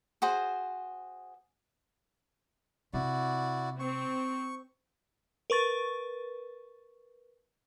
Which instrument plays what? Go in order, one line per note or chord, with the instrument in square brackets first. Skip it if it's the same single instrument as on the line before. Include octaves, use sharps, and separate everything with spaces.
[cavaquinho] F#4 G#4 C5
[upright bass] C3 [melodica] E4 F#4 D5
[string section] C4 [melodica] C#6
[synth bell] A#4 B4 C#6 A6